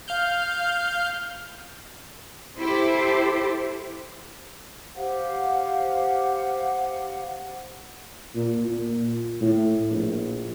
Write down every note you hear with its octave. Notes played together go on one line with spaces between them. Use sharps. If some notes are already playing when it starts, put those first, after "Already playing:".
F5 F6 G6
E4 G4 A4 C5
G4 C5 F5 F#5
A#2
A#2
A2
A#1